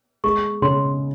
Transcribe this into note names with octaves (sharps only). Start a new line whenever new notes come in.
G#3 C#6
C#3 C6